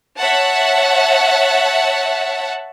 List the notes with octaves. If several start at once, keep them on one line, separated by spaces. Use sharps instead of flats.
C#5 E5 F#5 A5